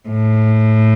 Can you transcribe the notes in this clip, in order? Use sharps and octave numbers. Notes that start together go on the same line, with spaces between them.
A2